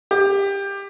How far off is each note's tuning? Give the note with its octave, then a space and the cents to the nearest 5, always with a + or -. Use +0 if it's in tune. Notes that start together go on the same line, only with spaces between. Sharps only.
G4 +15